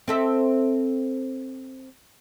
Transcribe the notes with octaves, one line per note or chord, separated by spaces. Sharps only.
C4 A4 E5